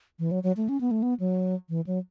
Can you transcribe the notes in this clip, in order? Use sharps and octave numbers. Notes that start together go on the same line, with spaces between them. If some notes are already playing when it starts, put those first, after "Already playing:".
E3
F#3
F#3
A3
C#4
B3
A3
B3
F#3
E3
F#3